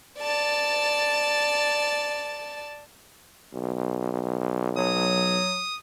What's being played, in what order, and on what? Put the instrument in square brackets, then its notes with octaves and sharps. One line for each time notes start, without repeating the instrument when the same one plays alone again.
[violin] D5 A5
[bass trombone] B1
[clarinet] F#3 [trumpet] D#6